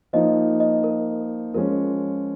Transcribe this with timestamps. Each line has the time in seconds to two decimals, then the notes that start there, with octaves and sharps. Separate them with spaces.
0.13 F3 A#3 D#4 D#5
0.60 D#5
0.84 A#4
1.54 F3 G#3 C#4 A#4